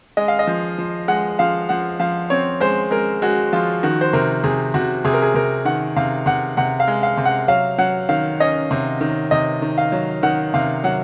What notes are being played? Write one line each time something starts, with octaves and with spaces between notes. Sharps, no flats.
G#3 D#5
F5
D#5
F3
F3
G#3 F#5
F3 F5
F3 F#5
F3 F5
C4 C#5
G#3 C5
G#3 A#4
G#3 F#4
F3 F4
D#3 F#4
C5
C3 A#4
C3 G#4
C3 F#4
C3 G#4
A#4
G#4
C3 A#4
D#3 F#5
C3 F5
C3 F#5
C3 F#5
F5
G#3
F5
C3
F#5
F#3 F5
F#3 F#5
D#3 F5
C#4 D#5
C3
D#3
C3 D#5
D#3
F5
F#3
D#3 F#5
C3 F5
F#3 F#5